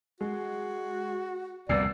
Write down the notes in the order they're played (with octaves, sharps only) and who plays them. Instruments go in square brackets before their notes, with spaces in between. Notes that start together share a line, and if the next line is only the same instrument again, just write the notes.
[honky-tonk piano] G#3 [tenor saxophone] F#4
[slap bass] C2 F2 A#2 [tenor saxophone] B3 [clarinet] D5 [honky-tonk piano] E6 C7